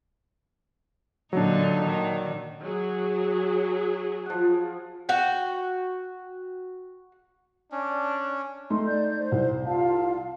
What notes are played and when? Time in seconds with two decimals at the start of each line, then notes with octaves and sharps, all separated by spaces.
1.33 A#2 D3 F#3 D4 D#4
1.85 D#3
2.62 F#3 G#4
4.26 F3 F#5
5.09 F#4 G5
7.72 C#4 D4
8.70 A3 D#4 C6
8.86 D5 G6
9.18 C5
9.32 C2
9.65 F4 F5 A5